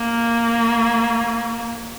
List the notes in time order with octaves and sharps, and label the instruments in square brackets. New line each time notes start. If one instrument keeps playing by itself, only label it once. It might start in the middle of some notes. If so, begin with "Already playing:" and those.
Already playing: [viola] A#3